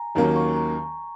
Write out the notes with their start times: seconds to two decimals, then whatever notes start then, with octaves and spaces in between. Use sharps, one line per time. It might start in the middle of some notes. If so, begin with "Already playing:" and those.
Already playing: G#5 A#5
0.15 D#2 D#3 F#3 A#3 C#4 A#5
0.36 C#6
0.56 A#5